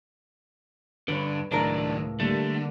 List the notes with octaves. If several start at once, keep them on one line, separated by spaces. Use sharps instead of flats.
E2 G2 D3 B4 C#5
C#2 A2 D#3 F#3 D4 A#4
D3 G3 A3 A#3 E4